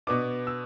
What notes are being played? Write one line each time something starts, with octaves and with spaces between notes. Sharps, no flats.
B2 B3 D4 D6
E6